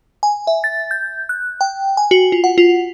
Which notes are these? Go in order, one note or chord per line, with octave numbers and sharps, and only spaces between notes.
G#5
E5
A6
G6
F#6
G5
G#5
F#4
F4
F#5
F4